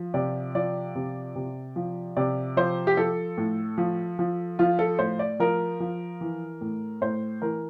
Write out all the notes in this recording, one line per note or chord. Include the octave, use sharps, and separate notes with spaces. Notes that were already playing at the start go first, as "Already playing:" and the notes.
Already playing: F3
C3 D5
F3 D5
C3
C3
F3
C3 D5
F3 C5
G4
F3 A4
A2
F3
F3
F3 F4
A4
A2 C5
D5
F3 A#4
F3
E3
A2
A2 C5
E3 A#4